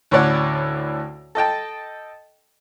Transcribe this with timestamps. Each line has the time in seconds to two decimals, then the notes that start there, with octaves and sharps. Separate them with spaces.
0.11 D2 A2 C#4 C#5 D5 F#5
1.35 A4 D#5 G5 A5